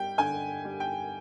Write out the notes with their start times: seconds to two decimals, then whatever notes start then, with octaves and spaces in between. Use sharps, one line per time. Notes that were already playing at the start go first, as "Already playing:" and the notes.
Already playing: G3 G5
0.18 D3 G#5
0.65 G3
0.80 G5